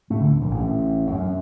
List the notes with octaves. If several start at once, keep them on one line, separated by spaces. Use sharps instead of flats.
A2 A3
D2 D3
A#1 A#2
A1 A2
F#2